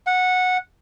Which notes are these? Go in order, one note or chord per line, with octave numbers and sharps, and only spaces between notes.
F#5